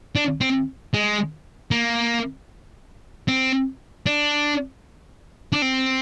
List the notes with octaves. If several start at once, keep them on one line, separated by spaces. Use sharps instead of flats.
D4
C4
G#3
A#3
C4
D4
D4
C4